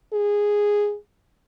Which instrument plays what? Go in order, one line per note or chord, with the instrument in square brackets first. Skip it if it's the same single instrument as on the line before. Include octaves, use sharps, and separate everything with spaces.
[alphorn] G#4